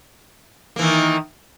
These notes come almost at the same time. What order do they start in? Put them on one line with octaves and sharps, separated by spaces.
A#3 E3 D#3